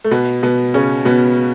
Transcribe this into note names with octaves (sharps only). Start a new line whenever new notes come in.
A3
B2 B3
B2 B3
C#3 C#4
B2 B3